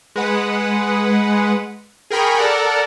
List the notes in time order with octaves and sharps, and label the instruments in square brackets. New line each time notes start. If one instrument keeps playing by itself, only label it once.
[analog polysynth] G#3 B4 F#5
G#4 A#4 G5 B5 C#6
A4 A#4 D5 F#5